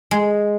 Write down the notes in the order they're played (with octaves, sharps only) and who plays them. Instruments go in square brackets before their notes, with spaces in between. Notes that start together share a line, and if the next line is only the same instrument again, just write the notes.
[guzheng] G#3